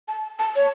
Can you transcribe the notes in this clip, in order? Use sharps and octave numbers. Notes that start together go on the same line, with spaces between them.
A5
A5
C#5